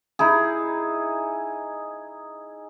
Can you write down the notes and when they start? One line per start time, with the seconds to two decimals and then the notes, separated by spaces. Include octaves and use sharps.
0.19 D#4 E4 G#4